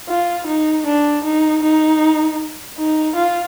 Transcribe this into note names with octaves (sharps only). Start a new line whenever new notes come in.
F4
D#4
D4
D#4
D#4
D#4
F4